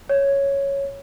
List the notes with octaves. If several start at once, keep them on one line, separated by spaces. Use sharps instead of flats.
C#5